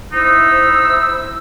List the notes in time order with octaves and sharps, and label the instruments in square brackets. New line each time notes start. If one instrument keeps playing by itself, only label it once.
[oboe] D#4 [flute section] E4 C5 E6